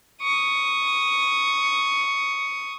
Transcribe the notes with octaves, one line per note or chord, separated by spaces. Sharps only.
C#6 D#6